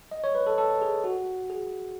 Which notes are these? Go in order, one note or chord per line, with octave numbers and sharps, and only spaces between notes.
D#5
C#5
B4
A4
A4
G#4
F#4
G#4